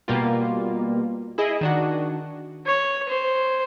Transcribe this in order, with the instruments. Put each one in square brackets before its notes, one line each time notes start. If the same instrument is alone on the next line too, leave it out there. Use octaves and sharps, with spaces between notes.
[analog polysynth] B2 G3 A#3 F4
E4 G#4 D#5
D#3 D4 F#4
[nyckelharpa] C#5
C5